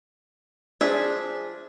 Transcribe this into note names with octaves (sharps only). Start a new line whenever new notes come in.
F3 D4 G#4 E5